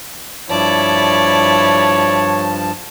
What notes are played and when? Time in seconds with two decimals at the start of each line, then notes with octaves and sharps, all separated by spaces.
0.50 G2 F3 E4 C#5 D5 A5